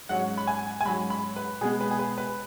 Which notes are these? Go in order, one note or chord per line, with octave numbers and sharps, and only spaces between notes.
G#2 F#3 C#4 F#5
B5
G#5
G#5
G#2 F#3 C#4 B5
B5
B4
B2 G#3 B3 G#4
B4
G#4
B4
B4